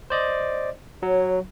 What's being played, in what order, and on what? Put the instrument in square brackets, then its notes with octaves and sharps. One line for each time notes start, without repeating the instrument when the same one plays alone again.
[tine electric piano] C5 D5 D#5
[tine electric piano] F#3 [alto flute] C#5